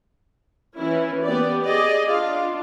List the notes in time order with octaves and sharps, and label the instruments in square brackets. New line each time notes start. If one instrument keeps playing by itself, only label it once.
[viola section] E3 C#4 E4
B3 G4 D5
[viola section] G#4 D5 [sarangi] D#5
[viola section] D4 F4 [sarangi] F5